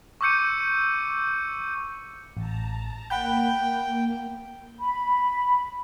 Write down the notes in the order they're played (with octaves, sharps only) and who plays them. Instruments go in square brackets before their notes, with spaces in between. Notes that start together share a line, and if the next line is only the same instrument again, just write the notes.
[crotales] C#6 D6 E6 G6 C#7 D#7
[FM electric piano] A1 [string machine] A5 A#5
[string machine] A#3 [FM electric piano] F#5 B5 G6 [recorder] G5
[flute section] B5